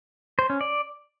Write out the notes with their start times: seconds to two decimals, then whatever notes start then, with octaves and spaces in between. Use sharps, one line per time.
0.39 C5
0.50 C#4
0.61 D5